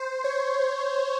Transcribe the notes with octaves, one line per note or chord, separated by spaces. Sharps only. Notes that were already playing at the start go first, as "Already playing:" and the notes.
Already playing: C5
C#5